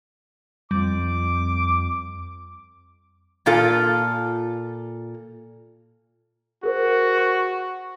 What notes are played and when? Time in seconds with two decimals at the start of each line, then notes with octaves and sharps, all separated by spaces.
0.71 F2 G3 D6
3.46 A#2 F4 A4
6.63 F#4 G#4 A#4 C5
7.18 C#6